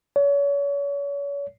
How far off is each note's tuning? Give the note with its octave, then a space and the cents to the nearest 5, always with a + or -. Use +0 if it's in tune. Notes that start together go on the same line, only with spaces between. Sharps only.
C#5 +35